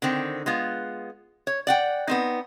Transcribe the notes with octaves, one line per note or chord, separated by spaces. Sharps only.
D3 D#3 C4
G#3 B3 F4
C#5
D5 F#5 G5
B3 C4 D#4